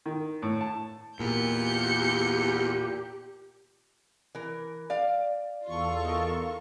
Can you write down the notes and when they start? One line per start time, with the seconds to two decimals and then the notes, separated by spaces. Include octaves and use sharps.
0.06 D#3
0.42 A2
0.61 A5
1.20 E2 A#2 G4 G6 C#7
4.35 E3 A#4
4.90 D5 F5
5.67 E2 F4 A4 C#6
6.05 D#4 A#4